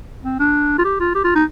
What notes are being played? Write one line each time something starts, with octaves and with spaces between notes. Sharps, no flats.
C4
D4
F4
G4
F4
G4
F4
D#4